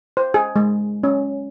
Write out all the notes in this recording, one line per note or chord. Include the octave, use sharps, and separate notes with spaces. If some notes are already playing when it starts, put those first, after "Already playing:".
C5
G#4
G#3
C#4